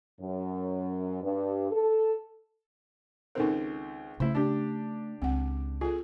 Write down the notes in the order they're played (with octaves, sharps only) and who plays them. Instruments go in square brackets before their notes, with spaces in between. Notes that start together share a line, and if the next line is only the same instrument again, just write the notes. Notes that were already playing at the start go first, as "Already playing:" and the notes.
[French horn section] F#2
G2
A4
[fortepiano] C#2 D#3 C4 [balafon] D#4 A4 A#4
[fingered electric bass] C#3 [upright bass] A3 [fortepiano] E4 C5
[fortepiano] D4 G4
[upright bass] C#2 [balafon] C4 F#5
[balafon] F4 A4 [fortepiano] G#4